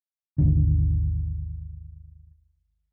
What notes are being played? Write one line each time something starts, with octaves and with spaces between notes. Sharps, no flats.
G#1 D#2 D3